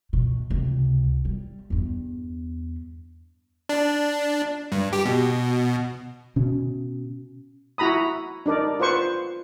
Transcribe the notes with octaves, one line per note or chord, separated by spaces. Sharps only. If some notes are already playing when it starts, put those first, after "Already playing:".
B2
C#2 C3
G3
E2 G2
D4
G2
G4
B2
B2 C#4
E4 F#4 A#5 B5 D#6
D4 D#4 A#4 D5
F4 B4 C5 C#6